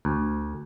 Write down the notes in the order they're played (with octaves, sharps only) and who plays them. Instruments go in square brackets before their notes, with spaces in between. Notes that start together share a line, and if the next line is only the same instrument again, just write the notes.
[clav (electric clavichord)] D2